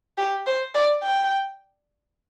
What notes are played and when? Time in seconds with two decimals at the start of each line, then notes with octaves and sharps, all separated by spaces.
0.18 G4
0.46 C5
0.75 D5
1.03 G5